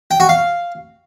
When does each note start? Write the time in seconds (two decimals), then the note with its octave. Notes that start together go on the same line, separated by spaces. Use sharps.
0.11 G5
0.20 F#4
0.29 F5